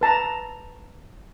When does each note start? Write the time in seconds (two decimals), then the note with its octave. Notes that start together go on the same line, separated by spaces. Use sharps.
0.01 B4 A5 A#5